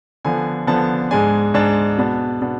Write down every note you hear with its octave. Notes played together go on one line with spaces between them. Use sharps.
D3 F3 B3 G#5
D3 F3 B3 A5
G#2 G#3 D4 G#5
G#2 G#3 D4 A5
B2 B3 D4
B2 B3 D4